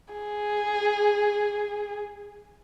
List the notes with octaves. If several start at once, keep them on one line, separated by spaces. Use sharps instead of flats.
G#4